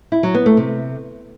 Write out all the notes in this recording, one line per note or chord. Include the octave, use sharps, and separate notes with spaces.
E4
F#3
B3
A3
C3